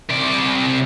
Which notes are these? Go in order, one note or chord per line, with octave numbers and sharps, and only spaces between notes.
C3 D5